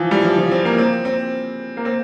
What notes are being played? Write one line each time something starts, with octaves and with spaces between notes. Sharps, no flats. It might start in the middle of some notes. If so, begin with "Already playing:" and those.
Already playing: E3 F3
G3
F3
F3
C4
A#3
C4
C4
A#3
C4